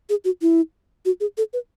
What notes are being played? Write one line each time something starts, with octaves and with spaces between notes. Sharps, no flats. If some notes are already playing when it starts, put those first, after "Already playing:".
G#4
F#4
E4
F#4
G#4
A4
B4